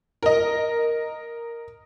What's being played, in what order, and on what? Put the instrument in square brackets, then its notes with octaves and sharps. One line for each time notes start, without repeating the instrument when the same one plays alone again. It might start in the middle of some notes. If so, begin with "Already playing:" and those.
[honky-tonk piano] A#4 D#5